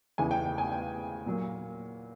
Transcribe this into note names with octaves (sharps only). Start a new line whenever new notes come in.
E2 C#3 E3 G#5
G5
G5
G#5
G5
A#2 F#3 A#3